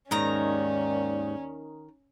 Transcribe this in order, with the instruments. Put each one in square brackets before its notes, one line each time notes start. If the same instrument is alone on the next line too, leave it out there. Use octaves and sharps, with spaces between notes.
[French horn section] D#2 D5 [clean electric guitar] G#2 D#4 [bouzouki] D#3 A#5 [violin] C#4